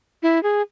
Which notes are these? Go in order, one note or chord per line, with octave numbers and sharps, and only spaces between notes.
E4
G#4